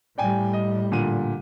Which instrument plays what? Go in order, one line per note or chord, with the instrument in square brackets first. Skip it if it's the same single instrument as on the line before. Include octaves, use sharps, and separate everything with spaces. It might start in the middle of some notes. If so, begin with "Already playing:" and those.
[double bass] A2 G3 [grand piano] D5 G5 G#5
[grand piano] D#5
A#2 D3 D#7